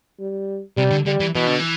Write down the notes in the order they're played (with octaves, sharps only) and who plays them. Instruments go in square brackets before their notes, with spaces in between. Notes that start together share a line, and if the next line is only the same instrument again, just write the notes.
[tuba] G3
[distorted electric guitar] C3 [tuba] G3
[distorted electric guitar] D3
[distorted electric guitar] D3 [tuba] G3
[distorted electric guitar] E3
[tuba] B2 [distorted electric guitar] E3
[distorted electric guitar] D3
E3